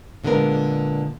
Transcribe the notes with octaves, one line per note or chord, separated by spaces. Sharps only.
A#2 D3 G#3 B3 A#4